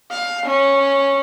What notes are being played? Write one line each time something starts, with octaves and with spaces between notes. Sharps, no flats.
F5
C#4